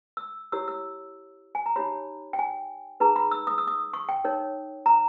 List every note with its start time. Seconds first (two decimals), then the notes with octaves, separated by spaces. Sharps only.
0.17 E6
0.52 E4 G4 A#4 C#5 E6
0.68 E6
1.55 G#5
1.66 A#5
1.76 D#4 G4 C#5 B5
2.33 G5
2.39 G#5
3.00 D#4 G#4 B4 A#5
3.16 B5
3.31 E6
3.47 D#6
3.58 E6
3.68 D#6
3.94 C#6
4.09 G5
4.24 D#4 A#4 C#5
4.86 A#5